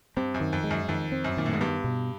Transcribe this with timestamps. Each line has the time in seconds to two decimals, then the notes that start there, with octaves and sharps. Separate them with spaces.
0.17 G2 C4
0.34 F#2
0.40 D#3
0.53 F2
0.64 G#3
0.71 F#2
0.88 F2 D#3
1.12 C4
1.24 F#2
1.37 A#2 D#3
1.46 A2
1.53 G#2
1.61 G2 B3
1.84 B2